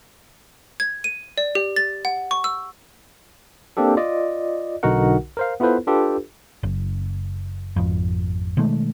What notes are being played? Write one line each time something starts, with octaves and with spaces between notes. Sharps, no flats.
G#6
D#7
D5
G4
A6
F#5
C#6
E6
A#3 C4 D4 G4 A4
F4 D5 D#5
B1 D3 D#4 F#4 A#4 F#5
A#4 C5 F5
B3 E4 F4 A4 B4 C5
D4 F4 G4 A4 B4
F#1
G#1 F2
B2 D#3 G#3 A3